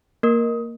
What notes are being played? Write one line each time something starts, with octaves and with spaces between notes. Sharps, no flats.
A#3 A#4